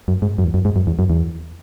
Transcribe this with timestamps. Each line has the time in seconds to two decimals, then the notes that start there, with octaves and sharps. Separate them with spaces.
0.08 F#2
0.22 G#2
0.38 F#2
0.44 E2
0.54 F#2
0.65 G#2
0.76 F#2
0.87 E2
0.99 F#2
1.10 E2